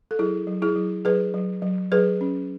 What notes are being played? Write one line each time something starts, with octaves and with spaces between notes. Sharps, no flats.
A4
F#3 E4 G#4
F#3
E4 G#4
F#3
F#3 G#4 B4
F#3
F#3
F#3 G#4 B4
C#4